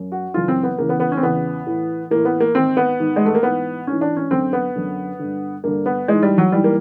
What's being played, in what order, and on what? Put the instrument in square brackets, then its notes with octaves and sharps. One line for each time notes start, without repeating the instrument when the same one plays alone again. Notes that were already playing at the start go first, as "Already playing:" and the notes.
Already playing: [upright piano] F#2
F#4
F#2 C#3 E3 F4
C4
B3
E2 C#3 E3 A#3
B3
B3
C#4
C4
E2 C#3 E3 B3
A2 E3
A2 E3 A#3
B3
A#3
G#2 D#3 C4
B3
G#2 D#3
G#3
A3
A#3
G#2 E3 B3
G#2 E3 C#4
D4
C#4
F#2 D3 C4
B3
F#2 D3
G2 D3
G2 D3 A#3
B3
G#2 E3 G#3
G3
F#3
G#2 E3 G3
A#3